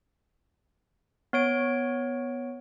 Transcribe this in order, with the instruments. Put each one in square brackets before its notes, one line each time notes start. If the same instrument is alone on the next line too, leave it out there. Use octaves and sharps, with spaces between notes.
[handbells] B3 C#5 D7